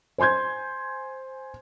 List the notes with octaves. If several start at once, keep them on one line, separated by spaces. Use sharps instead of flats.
C5 G#5 C6 G6 G#6